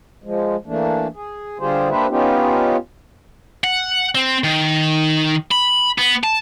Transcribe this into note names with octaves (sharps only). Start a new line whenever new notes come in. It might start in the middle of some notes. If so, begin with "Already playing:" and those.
F3 G#3
E3 A3 A#3 D4
G#4
D3 G3 F4 G4 G#4 C5
A#3 D4 G4 B4 C5 E5
B3 C#4 D#4 F4 G4
F#5
C4
D#3
B5
B3
A5